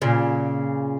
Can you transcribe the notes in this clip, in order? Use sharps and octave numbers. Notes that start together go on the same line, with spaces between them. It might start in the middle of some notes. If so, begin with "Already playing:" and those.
A#2 C#3